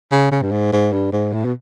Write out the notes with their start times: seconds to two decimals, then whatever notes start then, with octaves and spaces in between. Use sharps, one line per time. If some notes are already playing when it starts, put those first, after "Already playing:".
0.12 C#3
0.32 C#3
0.42 G2
0.52 G#2
0.72 G#2
0.93 G2
1.12 G#2
1.33 A2
1.45 B2